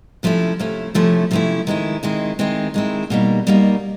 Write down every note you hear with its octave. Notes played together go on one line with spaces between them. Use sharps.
C3 F3 A3 C#4 E4
C3 F3 A3 C#4 E4
C3 F3 A3 C#4 E4
C3 F3 A3 C#4 E4
D#3 G#3 C4 E4
D#3 G#3 C4 E4
D#3 G#3 C4 E4
D#3 G#3 C4 E4
B2 G3 A#3 D#4
B2 G3 A#3 D#4